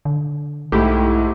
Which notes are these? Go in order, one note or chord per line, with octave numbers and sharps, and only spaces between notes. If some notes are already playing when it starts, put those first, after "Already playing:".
D3
B1 G#2 A3 E4 G4